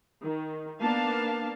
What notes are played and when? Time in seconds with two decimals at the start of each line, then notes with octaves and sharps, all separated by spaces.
0.24 D#3
0.82 A#3 B3 D4 F5 A5